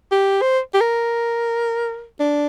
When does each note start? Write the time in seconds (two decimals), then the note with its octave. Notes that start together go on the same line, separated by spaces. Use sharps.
0.12 G4
0.41 C5
0.74 G4
0.81 A#4
2.20 D4